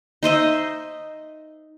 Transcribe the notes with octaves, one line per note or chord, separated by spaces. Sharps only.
D#4 C5 D#5 E5